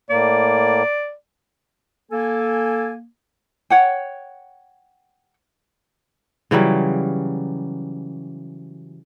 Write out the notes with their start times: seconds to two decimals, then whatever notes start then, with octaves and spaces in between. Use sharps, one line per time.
0.10 A2 A#3 D5
2.12 A#3 A4 G#5
3.70 C#5 F#5 G5
6.51 C#3 E3 F#3 G3